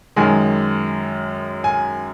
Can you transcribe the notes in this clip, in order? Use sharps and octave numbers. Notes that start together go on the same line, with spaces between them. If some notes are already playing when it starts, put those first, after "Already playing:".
F#2 D#3 G#3 G#5
G#5